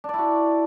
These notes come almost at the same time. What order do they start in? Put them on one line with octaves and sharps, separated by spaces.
D4 D5 E4 F#4